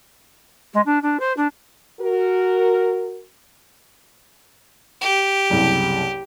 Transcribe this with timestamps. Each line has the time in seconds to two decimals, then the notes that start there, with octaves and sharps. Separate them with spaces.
0.73 G#3
0.85 D4
1.02 D4
1.19 C5
1.36 D4
2.01 F#4 A#4
5.02 G4
5.50 F#1 C2